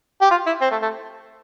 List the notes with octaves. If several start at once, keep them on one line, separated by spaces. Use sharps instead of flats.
G4
F4
E4
C4
A3
A3